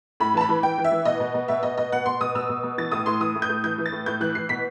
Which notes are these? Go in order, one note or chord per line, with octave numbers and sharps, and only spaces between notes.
A2 B5
E3 A5
B5
E3
E3 G5
E3
E5
E3
B2 D#5
B2
B2
B2 E5
B2 D#5
B2 D#5
B2 F#5
B2 C6
B2 D#6
B2 E6
B2
B2
E3 A6
A2 D#6
A2 C6
E3 D#6
A2
G6
A2
E3 G6
E3
A6
A2
A2 G6
E3 F#6
E3 C7
B2 B6